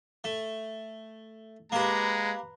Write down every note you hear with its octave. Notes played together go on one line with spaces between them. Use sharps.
A3
G#3 A#3 G4 B4 A#5